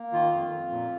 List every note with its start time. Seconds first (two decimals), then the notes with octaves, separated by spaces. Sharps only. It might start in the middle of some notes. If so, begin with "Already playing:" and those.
Already playing: A#3
0.12 D#3 F4
0.33 F2
0.51 F2
0.71 A#2